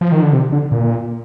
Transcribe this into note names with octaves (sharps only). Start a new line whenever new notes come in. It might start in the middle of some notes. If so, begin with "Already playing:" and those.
F3
D#3
D3
C3
D3
A#2